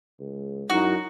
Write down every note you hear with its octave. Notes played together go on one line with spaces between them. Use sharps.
C#2
F#2 D#4 E4 F#4